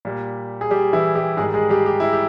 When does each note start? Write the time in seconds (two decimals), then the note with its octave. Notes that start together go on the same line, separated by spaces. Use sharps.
0.05 A#2 G3
0.61 G#4
0.71 G3 G4
0.93 E3 E4
1.15 G3 G4
1.37 G#2 D#3 G3 G#3 G#4
1.54 G#3 G#4
1.70 G3 G4
1.86 G4
2.00 E4
2.13 G4